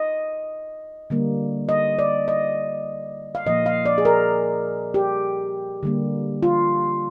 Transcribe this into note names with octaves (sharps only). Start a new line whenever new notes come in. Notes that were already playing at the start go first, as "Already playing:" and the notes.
Already playing: D#5
D3 G3 A#3
D#5
D5
D#5
F5
A#2 F3 A#3 D#5
F5
D5
G#4
A#4
G4
D3 G3 A#3
F4